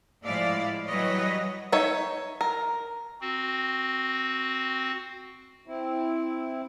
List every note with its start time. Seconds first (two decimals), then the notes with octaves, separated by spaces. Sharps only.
0.23 A2 F3 G#3 E4 D5 F5
0.87 E3 F#3 G3 B4 C#5 D#5
1.72 D#4 C#5 E5
2.41 A#4
3.21 C4 F#4
5.67 C4 E4